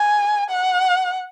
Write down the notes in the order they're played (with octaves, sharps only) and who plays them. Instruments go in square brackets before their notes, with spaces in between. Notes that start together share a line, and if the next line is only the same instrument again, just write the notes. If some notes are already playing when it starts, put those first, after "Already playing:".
Already playing: [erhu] G#5
F#5